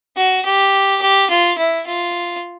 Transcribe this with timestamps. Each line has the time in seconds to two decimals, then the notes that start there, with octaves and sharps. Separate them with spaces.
0.17 F#4
0.46 G4
1.02 G4
1.30 F4
1.58 E4
1.87 F4